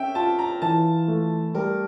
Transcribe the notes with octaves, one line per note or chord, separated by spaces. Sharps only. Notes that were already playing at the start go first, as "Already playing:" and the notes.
Already playing: C#4 E5 G5
F4 A5
A#5
E3 A5
A3
G3 A#4